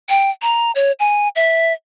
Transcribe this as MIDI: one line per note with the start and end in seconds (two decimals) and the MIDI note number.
0.09 0.30 79
0.42 0.72 82
0.75 0.92 73
1.00 1.28 80
1.36 1.73 76